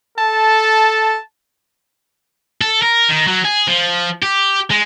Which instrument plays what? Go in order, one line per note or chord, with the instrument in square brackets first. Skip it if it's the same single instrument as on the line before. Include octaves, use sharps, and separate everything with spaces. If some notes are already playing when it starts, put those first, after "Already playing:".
[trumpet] A4 [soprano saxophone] A5
[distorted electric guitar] A4
A#4
D#3
F#3
G#4
F3
G4
G#3